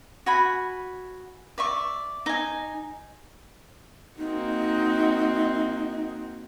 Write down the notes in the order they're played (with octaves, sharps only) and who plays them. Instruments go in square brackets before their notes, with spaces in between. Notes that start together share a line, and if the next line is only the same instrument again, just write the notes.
[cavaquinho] F#4 G#5 B5
D5 E5 C#6
D#4 G#5
[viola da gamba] A#3 C4 F#4 [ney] D#4